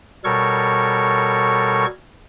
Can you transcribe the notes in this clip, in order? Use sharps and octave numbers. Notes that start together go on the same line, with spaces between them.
B2 G3 A4 A#4 C#5 C#6